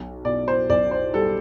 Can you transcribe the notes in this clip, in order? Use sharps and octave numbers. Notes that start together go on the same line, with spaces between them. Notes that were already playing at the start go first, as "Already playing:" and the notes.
Already playing: B1
B2 D5
C5
B1 D5
C5
G3 A4